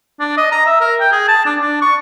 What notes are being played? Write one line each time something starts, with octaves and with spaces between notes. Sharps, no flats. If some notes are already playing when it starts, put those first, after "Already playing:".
D4
D#5
A#5
E5
A#4
G5
G#4
A5
D4
D4
C#6